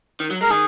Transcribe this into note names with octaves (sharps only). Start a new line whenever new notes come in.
D#3
F#3
G#3 A#4
D#3 G#4